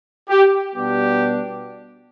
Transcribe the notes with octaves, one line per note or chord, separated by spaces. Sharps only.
G4
B2 G3 B3 D4 G4